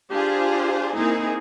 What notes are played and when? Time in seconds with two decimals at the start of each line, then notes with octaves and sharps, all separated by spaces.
0.10 D4 F4 G4 G#4 C5
0.96 A#3 C4 D#4 E4 G#4 A#4